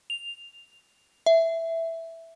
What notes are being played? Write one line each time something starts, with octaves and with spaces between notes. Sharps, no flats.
F7
E5